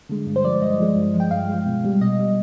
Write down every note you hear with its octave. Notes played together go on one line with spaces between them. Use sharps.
D3 G#3
G2
C5
F3 G#3 D5
G2 D#5
F3 G#3
G2
F3 G#3
G5
G2 F5
F3 G#3
B2
G3
B2 D#5
G3